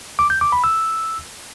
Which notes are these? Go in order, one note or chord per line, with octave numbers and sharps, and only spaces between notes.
D6
G6
D6
B5
E6